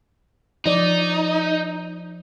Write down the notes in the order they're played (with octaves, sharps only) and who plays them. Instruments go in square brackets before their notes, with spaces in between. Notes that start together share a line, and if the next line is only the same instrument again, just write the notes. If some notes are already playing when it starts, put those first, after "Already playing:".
[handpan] F3 D5 [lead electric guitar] D#4